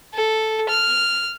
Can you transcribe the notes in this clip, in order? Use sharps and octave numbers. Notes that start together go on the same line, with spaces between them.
A4
F6